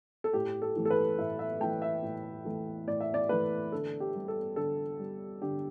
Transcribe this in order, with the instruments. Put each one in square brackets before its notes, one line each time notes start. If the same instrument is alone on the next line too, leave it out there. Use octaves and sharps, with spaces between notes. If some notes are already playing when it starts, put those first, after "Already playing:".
[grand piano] A4
A2 G4
A4
E3 A3
A4
B4
A2 E5
E5
E3 A3 G5
E5
A2
E3 A3
A2 D5
E5
D5
E3 A3 B4
D3 A4
G4
G3
A4
D3 A4
G3
D3 G4